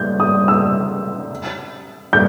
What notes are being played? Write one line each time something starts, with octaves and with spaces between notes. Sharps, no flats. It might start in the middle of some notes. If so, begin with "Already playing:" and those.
Already playing: G6
D#6
E6
G6